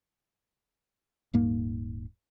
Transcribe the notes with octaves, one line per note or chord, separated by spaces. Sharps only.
D#1 G#2 A#3